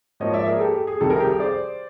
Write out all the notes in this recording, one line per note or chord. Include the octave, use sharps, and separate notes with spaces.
G#2 F3 A#3 C#5 D#5
D5 E5
G#4 A#4
G4 A4
G4
G#4
C2 C3 D#3 G3 G4 A4
G#4 A#4
G4 A4
G#4
C5 D5